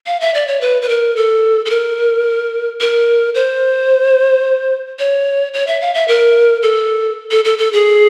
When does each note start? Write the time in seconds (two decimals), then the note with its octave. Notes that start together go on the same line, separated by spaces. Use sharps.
0.07 F5
0.21 E5
0.34 D5
0.47 C#5
0.61 B4
0.82 B4
0.89 A#4
1.16 A4
1.65 A4
1.70 A#4
2.81 A#4
3.35 C5
4.99 C#5
5.54 C#5
5.67 E5
5.81 F5
5.94 E5
6.08 A#4
6.63 A4
7.31 A4
7.45 A4
7.58 A4
7.73 G#4